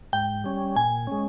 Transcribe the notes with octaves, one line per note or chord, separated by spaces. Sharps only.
G#2 G5
G3 C#4
A#2 G#5
G#3 C#4